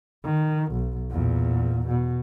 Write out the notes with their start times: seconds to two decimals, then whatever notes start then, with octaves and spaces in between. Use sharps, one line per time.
0.25 D#3
0.72 B1
1.11 E2 A#2
1.88 B2